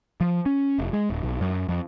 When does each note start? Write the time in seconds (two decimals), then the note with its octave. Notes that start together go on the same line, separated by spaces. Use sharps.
0.21 F3
0.46 C#4
0.79 F1
0.93 G#3
1.10 D1
1.23 B1
1.41 F#2
1.68 F2